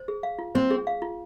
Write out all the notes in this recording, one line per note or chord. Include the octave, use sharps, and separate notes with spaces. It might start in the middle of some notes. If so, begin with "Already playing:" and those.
Already playing: C5
G#4
F5
F4
C4 C5
G#4
F5
F4